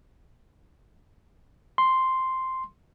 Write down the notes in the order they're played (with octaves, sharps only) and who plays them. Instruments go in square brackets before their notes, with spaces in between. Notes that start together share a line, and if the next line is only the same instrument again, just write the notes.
[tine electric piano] C6